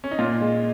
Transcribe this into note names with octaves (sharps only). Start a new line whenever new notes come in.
C#4
D#4
A#2 F4
G#3